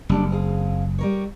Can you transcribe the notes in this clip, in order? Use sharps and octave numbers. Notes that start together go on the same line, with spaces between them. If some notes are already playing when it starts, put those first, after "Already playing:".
F#1 G3 D4
C4 G#4 F5
G3 A#4 C#5